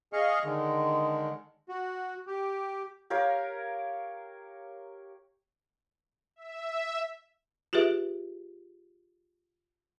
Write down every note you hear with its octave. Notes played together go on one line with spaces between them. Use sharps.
G#4 D#5 F5 C#6
D3 D#3 G#3
F#4
G4
G4 A#4 C#5 F5
E5
F4 G4 G#4 B4 E5